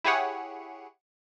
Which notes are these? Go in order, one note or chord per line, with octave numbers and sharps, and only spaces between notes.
E4 G4 G#4 C#5 F#5